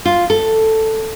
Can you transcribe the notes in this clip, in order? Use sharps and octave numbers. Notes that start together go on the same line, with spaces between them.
F4
A4